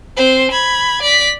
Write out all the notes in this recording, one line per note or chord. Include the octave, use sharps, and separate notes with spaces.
C4 C5
B5 G#6
D5 B6